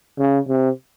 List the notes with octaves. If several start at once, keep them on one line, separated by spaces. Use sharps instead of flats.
C#3
C3